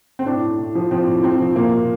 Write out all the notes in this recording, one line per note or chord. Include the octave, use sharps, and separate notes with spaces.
C4
A2 D4
A2
A2
F3
F3 C4
A2
F3 C4
F3
A#2 A#3
A#2